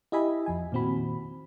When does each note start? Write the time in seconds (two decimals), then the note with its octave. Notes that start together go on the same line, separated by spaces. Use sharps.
0.12 E4 G4 D#5 E5 G#5 B5
0.46 F2 F3 G#5
0.72 A#2 D#3 C4 F#4 B5